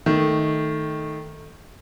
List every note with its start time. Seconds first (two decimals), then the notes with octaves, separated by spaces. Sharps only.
0.06 D#3 A3